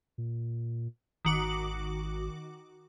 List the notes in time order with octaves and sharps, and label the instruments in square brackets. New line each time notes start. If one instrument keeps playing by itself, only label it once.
[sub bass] A#2
[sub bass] G#1 [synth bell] D#3 F#4 D6